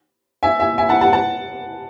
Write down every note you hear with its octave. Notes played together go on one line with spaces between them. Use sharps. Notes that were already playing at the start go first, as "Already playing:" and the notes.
E5 G#5
E5 G#5
E5 G#5
F#5 A5
F#5 A5
F#5 A5